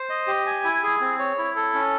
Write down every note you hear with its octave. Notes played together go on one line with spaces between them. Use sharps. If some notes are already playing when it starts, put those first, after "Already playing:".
Already playing: C5
D#5
G4
G#5
E4
G#4
C4
C#5
E4
A4
C#4